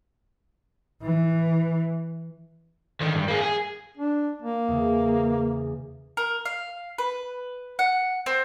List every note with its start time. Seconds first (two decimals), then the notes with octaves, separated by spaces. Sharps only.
1.02 E3
3.01 D3 D#3
3.14 G2
3.28 A#3 G#4
3.41 G#4
3.98 D4
4.42 A#3
4.68 E2 C#3
6.17 A#4
6.45 F5
6.98 B4
7.79 F#5
8.26 C4